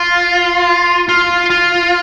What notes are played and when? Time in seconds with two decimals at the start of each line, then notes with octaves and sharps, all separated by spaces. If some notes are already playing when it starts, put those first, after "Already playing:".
Already playing: F4
1.09 F4
1.50 F4